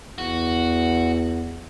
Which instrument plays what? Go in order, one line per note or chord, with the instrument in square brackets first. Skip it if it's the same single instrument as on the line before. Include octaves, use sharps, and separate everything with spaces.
[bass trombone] E2 [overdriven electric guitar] F#4